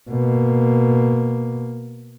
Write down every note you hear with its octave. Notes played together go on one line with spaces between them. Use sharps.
B2 A#3